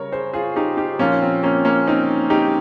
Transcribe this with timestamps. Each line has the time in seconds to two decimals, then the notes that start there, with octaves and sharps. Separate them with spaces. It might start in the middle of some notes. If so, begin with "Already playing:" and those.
Already playing: C#3 G3 A#4 C#5
0.12 G#4 C5
0.33 F4 G#4
0.56 D#4 G4
0.77 D#4 G4
0.99 A#2 F3 A#3 C#4 F4
1.21 C4
1.43 A#3 C#4
1.65 A#3 C#4
1.87 C4 D#4
2.30 D#4 G4